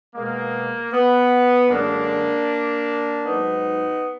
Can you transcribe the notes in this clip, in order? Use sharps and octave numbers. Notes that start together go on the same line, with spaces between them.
B2 G#3 A#3
B3
F#2 D3 G#3 A#3 D4
G#2 F#3 B3 D#4